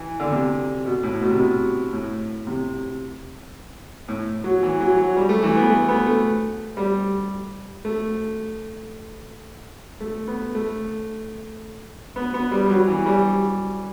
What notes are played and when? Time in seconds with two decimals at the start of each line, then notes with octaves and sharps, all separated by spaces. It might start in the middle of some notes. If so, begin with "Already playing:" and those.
Already playing: E3
0.20 D3
0.32 C3
0.86 B2
1.03 A2
1.21 B2
1.30 C3
1.37 B2
1.93 A2
2.47 C3
4.08 A2
4.44 F#3
4.63 E3
4.80 F#3
4.98 F#3
5.17 G3
5.29 A3
5.43 E3
5.57 B3
5.70 A3
5.88 B3
6.06 A3
6.77 G3
7.85 A3
10.00 A3
10.28 B3
10.55 A3
12.16 B3
12.34 B3
12.52 G3
12.66 G3
12.70 F#3
12.88 E3
13.06 G3